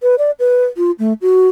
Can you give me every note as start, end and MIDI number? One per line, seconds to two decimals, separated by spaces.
0.03 0.16 71
0.19 0.31 74
0.40 0.65 71
0.77 0.91 65
0.99 1.13 57
1.22 1.48 66